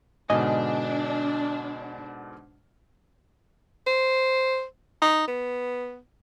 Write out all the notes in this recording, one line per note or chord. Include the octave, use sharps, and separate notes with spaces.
G#2 B2 D3 D4 D#5 G#5
C5
D#4
B3